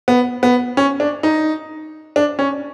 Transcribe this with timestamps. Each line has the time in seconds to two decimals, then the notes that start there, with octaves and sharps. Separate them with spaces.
0.08 B3
0.43 B3
0.77 C#4
1.00 D4
1.23 D#4
2.16 D4
2.39 C#4